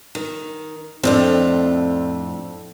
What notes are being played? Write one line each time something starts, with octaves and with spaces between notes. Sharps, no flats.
D#3
F2 A2 C4 D4 F4